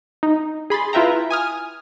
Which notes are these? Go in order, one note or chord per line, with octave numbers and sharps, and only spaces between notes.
D#4
G#4 B5 C6 A6
E4 F4 B4 E5 G5 A#5
G#5 D#6 F6